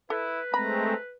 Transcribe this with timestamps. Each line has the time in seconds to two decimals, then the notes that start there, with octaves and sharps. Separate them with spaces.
0.10 E4 A4 B4
0.54 G#3 A3 C4 A#5 B5